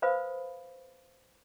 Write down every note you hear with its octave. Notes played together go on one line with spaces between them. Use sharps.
B4 C5 F5 B5 D#6